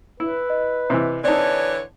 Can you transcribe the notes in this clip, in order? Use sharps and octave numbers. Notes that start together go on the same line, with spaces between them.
E4 B4
D#5
C3 E3
D3 E3 C4 D#4 C#5 D5 A5